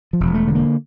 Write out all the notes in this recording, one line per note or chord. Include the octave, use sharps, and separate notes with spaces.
F3
E1
A3
D3
A#3